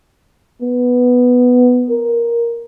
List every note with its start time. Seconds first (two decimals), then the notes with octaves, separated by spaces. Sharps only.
0.62 B3
1.89 A#4